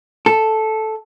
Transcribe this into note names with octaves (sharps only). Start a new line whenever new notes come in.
A4